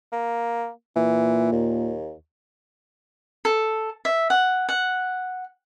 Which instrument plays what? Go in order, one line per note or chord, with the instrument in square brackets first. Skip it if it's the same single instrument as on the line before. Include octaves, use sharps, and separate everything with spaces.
[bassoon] A#3
[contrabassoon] A#2 [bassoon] E3
[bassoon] D#2
[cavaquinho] A4
E5
F#5
F#5